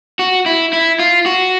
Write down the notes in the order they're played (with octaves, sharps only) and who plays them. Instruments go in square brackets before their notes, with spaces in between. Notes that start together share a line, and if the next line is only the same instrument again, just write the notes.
[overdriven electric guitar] F#4
E4
E4
F4
F#4